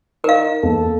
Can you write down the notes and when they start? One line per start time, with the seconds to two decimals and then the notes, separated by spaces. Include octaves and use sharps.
0.24 D#4 A#4 F5
0.63 E2 A#3 A4